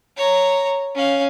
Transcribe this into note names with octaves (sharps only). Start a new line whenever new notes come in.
C#5 A#5
C#4 F5